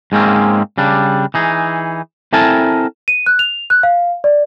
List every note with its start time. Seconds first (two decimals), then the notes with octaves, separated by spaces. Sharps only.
0.12 G#2 G#3 A#3 C4 C#4
0.78 C#3 G3 D4
1.34 E3 D#4 G#4
2.33 C4 E4 A4 A#4 G#5 A5
3.08 D#7
3.26 F#6
3.39 F7
3.70 F#6
3.83 F5
4.24 D5